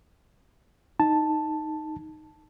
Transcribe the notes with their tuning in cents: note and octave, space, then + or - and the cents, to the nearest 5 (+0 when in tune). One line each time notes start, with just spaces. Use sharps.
D#4 +0 A5 +0